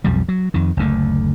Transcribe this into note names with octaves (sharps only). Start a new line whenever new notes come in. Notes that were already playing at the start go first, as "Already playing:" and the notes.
B1 F2 F3 G3
F#3
F2 D#3
F#1 D2 D3 A3